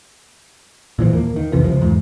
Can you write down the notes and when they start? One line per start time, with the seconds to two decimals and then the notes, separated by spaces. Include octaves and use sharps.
0.99 A#2 E3 F3
1.13 D#2 A#3
1.36 D#3
1.52 C2 F2 C3 E3
1.64 C#2 F3
1.81 E2 G#2